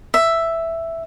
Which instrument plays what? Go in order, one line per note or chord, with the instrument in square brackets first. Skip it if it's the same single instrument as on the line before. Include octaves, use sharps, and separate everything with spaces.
[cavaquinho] E5